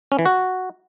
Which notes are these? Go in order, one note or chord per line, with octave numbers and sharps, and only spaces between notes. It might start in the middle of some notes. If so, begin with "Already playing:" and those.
C#4
E3
F#4